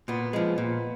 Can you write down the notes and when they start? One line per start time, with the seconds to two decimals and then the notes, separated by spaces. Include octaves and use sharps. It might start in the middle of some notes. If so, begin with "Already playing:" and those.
0.08 A#2 B3
0.33 F3 G#3
0.58 A#2